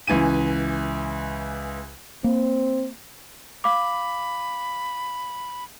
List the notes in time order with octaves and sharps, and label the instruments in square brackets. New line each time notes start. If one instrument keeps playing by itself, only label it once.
[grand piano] C#2 E3 G#5 D#7
[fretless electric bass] A#3 [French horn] C4
[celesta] F5 D6 [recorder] B5